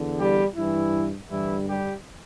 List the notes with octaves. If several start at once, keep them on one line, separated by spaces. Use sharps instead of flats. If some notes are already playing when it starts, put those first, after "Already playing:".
Already playing: E2 D3
G3 G4
G2 E3 G3 E4
G2 D3 E3 G3 E4
G3 G4